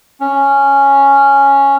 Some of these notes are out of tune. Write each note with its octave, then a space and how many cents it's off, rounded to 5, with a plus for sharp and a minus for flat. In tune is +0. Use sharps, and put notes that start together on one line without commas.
C#4 +0